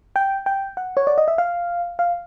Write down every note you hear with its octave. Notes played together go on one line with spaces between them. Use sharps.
G5
G5
F#5
C#5
D5
D#5
E5
F5
F5